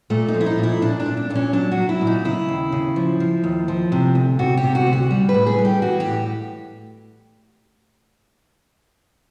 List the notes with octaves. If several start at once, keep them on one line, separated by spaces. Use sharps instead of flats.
A#2 A3
D#4
F3
E4
D#4
A#2 E4
A#2 D4
D4
A#2
D4
A#2 D4
C#4
F#3 D4
F#4
F#3
E4
A#2
D#4
C#3 E4
D#2
C#3
F3
F3
D#2
F3
C3
D2
C3 F#4
G4
C3
F#4
D2
F#4
G3
B4
A2
G#4
G3
G4
E3 F#4
G4
A2